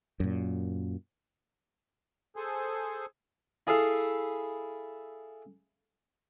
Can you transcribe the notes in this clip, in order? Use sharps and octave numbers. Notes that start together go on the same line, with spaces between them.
F#2 A#2
G#4 A4 C5 G#5
E4 G#4 A4 F5